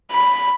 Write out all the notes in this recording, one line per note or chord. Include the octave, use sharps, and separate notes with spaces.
B5